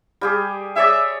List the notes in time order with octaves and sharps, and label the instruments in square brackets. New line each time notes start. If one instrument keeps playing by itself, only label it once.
[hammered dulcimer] G3 G4 G#4
[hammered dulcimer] G#4 C#5 D5 [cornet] E5